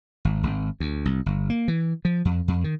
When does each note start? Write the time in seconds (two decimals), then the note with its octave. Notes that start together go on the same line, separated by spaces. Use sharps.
0.25 G#1
0.43 G#1
0.80 D2
1.05 C2
1.26 G1
1.50 A#3
1.68 E3
2.05 F3
2.25 F2
2.48 F2
2.64 D#3